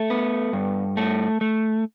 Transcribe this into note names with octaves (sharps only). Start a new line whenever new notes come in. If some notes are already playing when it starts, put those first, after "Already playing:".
Already playing: A3 A4
B3
G2
A3
A3